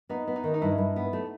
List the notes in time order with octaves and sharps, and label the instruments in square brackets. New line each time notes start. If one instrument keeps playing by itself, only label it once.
[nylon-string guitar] B3 [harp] D#4
[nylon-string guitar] B3
[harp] D#4
[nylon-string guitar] D#3
[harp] D#4
[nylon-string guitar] G2 [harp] E4
[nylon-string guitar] G2
B3
A3